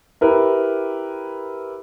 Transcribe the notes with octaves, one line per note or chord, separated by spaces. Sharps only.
E4 G4 A#4 B4